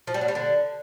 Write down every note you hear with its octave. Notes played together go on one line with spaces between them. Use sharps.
F3
G3
F#3
G3
D3